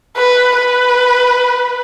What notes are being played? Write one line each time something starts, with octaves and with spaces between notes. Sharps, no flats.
B4
B4